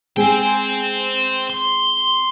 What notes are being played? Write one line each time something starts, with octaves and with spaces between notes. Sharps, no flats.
G#3 C4 G#4 C5 G5
C6